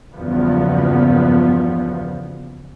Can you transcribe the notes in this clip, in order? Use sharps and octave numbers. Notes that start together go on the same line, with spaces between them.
F#1 E2 G2 F3 B3